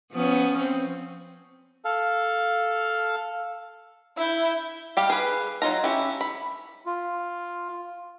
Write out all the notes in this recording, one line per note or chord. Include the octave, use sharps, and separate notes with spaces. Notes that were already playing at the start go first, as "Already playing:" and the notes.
F3 B3 C#4
C4
A4 F5
E4 E5 G6
G3 G4 F5
G#4 B4
F#3 D#4 F4 A#5
C#4 E4 G4
B5
F4